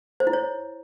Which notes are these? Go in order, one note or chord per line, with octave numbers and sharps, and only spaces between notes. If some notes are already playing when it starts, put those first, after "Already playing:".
C5
E4
C#5